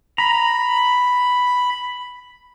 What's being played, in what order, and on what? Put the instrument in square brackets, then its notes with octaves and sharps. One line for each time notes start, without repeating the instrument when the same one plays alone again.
[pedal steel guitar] A#5 [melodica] B5